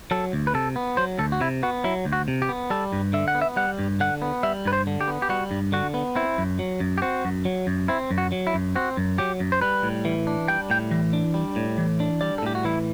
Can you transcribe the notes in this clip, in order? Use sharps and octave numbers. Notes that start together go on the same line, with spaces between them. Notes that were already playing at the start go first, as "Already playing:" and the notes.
F#3 A4
D2
B4
C3 A4
B3
F#3 C5
D2 A4
F#4
C3 E4
B3 F#4
F#3 E4
D2
F#4
C3
G4
B3
G3 A4
G2
D3 E5
F#5
B3
E5
G3 F#5
G2
D3 F#5
B3
G3 E5
G2 B4
C5
D3
G4
B3
G4
G3 F#4
G2
D3 F#4
B3
C4 E4
F#2
F#3
F#2
G4
C4 F#4
F#2
F#3
F#2
C4 E4
F#2
F#4
F#3
E4
F#2
C4 F#4
F#2
F#3 G4
F#2
C5
G3 B4
A2
E3
D4
G3 G5
A2 G5
E3
D4
G3
A2
E3
D4
G3 D5
A4
A2 G4
F#4
E3 E4